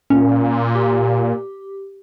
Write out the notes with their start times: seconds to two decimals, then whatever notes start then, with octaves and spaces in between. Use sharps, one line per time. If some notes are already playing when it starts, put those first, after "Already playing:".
0.10 A#2 C#4
0.75 G4